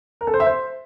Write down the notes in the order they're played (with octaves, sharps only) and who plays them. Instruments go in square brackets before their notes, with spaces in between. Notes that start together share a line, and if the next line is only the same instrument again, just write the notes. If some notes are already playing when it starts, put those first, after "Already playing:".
[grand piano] A#4
A4
C5
E5
C5